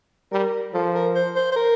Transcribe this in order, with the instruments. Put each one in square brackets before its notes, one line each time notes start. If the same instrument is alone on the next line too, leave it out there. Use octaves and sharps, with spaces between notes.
[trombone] G3 [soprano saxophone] A#4
[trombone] F3 [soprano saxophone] A4
[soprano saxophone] A#4
C5
C5
C5
A#4